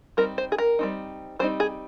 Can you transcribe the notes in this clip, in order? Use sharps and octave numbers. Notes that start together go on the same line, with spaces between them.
G3 C4 D#4 A#4
C5
G#4
A#4
G3 C4 D#4
G3 C4 D#4 C5
G#4